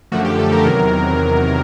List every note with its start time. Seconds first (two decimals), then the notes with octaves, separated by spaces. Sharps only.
0.12 F#2 D3 F3 A3 F#4
0.25 G4
0.39 A4
0.52 A#4
0.66 E2 C3 D#3 F#3